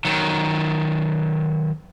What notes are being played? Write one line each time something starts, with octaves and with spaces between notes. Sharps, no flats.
D#3 F#3